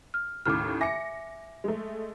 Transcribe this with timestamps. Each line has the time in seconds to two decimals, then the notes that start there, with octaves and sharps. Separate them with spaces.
0.14 F6
0.45 D#2 A2 C#3 D6 F6
0.81 E5 G#5 D6 A#6 C#7
1.64 G#3 A3